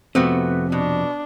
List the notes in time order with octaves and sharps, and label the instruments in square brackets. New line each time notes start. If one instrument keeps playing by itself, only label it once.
[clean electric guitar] F2 C3 [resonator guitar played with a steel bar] A3 B3 F#4 [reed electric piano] C4
[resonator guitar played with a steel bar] B2 [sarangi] D4